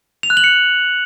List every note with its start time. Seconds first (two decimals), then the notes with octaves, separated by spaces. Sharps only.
0.23 F7
0.30 F#6
0.37 F#7
0.44 C#7